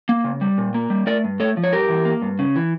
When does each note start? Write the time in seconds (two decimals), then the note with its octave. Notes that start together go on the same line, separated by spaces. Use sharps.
0.09 A#3
0.24 C#3
0.41 G3
0.58 A#2
0.74 A#3
0.90 G3
1.06 A3 A#4 D5
1.24 G2
1.40 A3 A4 C#5
1.57 F3
1.63 C#5
1.72 G2 G4 A#4
1.89 E3
2.05 A#3
2.22 G2
2.39 C#3
2.56 E3